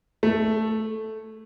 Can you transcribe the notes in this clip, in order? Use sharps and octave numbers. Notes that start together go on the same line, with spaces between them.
A3